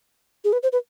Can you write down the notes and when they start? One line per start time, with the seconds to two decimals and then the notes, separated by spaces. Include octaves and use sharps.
0.44 G#4
0.52 B4
0.63 C5
0.72 B4